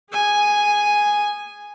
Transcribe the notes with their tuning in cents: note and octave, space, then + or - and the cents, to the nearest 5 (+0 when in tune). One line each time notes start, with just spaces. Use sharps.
G#4 -20 G#5 +0